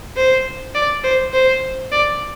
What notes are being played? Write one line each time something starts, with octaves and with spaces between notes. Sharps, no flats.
C5
D5
C5
C5
D5